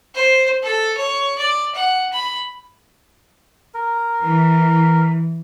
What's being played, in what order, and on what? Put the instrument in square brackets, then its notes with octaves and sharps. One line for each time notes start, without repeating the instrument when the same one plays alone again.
[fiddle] C5
A4
C#5
D5
F#5
B5
[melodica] A#4
[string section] E3